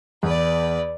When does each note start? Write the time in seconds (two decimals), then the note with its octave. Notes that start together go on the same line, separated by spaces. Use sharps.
0.23 E2 B4 D5